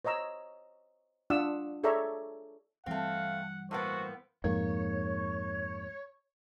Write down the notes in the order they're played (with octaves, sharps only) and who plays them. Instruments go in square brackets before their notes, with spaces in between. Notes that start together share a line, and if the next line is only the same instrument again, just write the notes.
[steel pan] C5 C#5 D#5 A#5 E6
D4 F4 D5 F#5 D#6 E6
G#4 A4 C#5 D5 E5 A#5
[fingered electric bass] G2 E3 G3 [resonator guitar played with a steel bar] A3 C4 [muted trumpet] F5 [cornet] F#5
[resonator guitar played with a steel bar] A2 A#3 B3 [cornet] F#4 [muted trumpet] C5
[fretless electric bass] F2 G#2 A#3 [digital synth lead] C#5